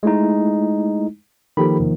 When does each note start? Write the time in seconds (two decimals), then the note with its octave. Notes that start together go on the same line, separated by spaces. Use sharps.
0.03 G#3 A3 D#4 E4
1.57 D#3 F3 A#3 G4 A4 B5
1.80 E2 C3